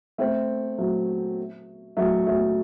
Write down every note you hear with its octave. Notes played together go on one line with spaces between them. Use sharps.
A3 C4
F#3 A3
F#3 A3
F#3 A3